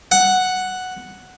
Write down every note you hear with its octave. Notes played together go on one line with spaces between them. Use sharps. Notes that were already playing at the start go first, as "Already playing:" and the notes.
F#5